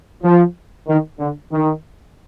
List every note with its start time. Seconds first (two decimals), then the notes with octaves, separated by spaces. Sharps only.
0.23 F3
0.87 D#3
1.19 D3
1.51 D#3